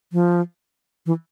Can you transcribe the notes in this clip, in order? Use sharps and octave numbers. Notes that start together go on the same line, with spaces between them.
F3
E3